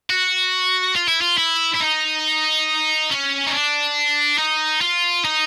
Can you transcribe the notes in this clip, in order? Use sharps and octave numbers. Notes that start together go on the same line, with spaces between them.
F#4
F4
E4
F4
E4
E4
D#4
C#4
D#4
D4
D#4
F4
D#4